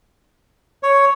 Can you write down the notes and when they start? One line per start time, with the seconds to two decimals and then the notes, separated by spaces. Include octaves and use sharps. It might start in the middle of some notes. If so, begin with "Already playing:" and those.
0.83 C#5